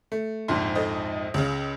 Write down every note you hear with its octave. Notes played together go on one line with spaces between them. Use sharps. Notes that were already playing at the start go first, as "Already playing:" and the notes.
A3
A#1 F2 G#2 C6
A4 C5 D#5
C#2 C#3